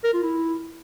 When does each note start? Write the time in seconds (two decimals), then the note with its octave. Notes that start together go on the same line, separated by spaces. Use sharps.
0.04 A#4
0.14 F4
0.23 E4